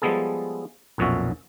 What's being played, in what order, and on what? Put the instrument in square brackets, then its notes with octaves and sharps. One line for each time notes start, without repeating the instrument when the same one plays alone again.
[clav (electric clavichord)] F3 G3 G#3 B3 G#4 A4
B1 F2 A#2 C#4 F#4 E5